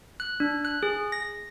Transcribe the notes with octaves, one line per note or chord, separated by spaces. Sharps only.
F#6
D4
F#6
G#4
A#6